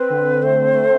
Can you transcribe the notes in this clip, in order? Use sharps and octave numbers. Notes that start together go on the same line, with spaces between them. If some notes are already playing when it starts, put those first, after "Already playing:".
Already playing: C4 B4
D3
D3
A3 C5
D3
A3